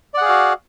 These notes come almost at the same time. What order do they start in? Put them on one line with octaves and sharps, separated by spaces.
D5 F#5 G#4 F5 F#4